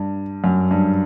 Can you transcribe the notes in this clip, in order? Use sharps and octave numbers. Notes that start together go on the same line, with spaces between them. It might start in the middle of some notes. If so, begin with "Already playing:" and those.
Already playing: G2
F#2
G2